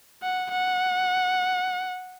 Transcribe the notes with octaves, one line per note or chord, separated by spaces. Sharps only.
F#5
F#5